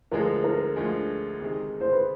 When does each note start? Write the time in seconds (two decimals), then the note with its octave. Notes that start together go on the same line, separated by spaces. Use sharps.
0.11 D2 D3 F3 G#3 A#4
0.44 A#4
0.76 D2 D3 F3 G#3
1.40 C3 D#3 G#3
1.81 C5
1.92 B4